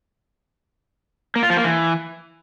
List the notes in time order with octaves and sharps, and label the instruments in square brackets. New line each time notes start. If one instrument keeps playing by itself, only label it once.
[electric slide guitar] A#3
F4
F3
A#3
E3